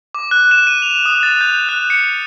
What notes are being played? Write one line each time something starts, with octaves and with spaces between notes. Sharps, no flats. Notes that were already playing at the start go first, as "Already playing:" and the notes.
D6
F#6
E7
D#7
F7
D#6
A6
G6
F#6
C#7